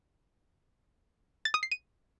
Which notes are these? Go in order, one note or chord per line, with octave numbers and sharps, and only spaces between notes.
A6
D#6
C7
D#7